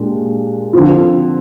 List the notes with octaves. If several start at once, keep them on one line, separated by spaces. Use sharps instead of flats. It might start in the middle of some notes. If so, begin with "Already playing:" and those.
Already playing: A#2 G#3 D4 G4
D3 F3 C4 F4